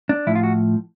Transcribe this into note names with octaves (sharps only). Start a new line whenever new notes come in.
D4
A2 F3 E4
F4
F#4